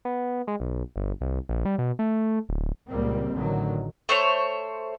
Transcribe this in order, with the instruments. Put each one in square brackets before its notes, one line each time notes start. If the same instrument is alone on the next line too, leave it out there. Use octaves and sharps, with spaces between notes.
[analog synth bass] B3
G#3
B1
G1
C2
A#1
G3
B2
A3
D1
[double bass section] C#2 A#2 G3 A#3 C4
A1 D3 D#3 F#3
[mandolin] A3 C5 C#5